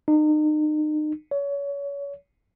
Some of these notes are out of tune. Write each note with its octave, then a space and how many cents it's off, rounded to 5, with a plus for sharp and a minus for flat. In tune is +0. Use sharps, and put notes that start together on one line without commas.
D#4 -35
C#5 +30